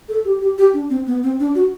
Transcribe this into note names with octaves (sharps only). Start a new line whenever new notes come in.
A4
G4
G4
G4
D4
C4
B3
C4
D4
F#4